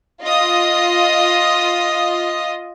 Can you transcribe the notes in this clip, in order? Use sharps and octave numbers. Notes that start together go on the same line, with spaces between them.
F4 D#5 D#6